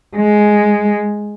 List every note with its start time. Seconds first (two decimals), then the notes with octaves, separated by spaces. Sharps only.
0.16 G#3